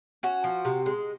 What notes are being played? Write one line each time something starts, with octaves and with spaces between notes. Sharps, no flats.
C#4 F#4
F3
C3
G#3